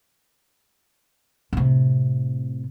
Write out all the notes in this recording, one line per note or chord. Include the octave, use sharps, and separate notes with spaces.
A2 C3